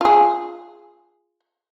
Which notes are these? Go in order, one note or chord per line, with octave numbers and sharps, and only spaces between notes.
F4 G#4